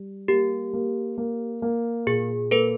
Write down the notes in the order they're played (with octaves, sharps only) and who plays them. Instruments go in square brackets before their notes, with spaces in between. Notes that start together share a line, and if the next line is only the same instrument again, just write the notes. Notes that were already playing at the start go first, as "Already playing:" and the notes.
Already playing: [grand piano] G3
[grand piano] A#3 [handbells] G4
[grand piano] A#3
A#3
A#3
[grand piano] A#2 [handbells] G#4
[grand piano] A#3 [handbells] A4 B4